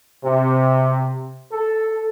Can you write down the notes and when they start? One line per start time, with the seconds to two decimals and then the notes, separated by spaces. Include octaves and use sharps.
0.24 C3
1.52 A4